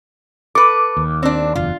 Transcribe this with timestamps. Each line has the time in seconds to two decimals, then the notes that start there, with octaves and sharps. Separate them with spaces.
0.55 A4 B4 D6
0.97 D#2
1.23 C4 D4
1.55 F#1 E2 F4